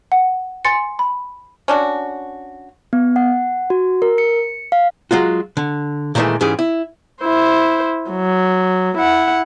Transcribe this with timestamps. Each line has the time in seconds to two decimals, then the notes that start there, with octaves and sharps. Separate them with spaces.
0.12 F#5
0.65 G#5 C6 A6 C#7
0.99 B5
1.68 C#4 D4 F#4
2.93 B3
3.16 F#5
3.70 F#4
4.02 A#4
4.18 C#7
4.72 F5
5.11 F#3 G#3 F4 F#4
5.57 D3
6.15 A#2 D#3 E3 F#3 G#3 A3
6.41 G#2 E3 C#4 G4 G#4
6.59 E4
7.22 E4 C5
8.11 F#3
8.98 E4 F#5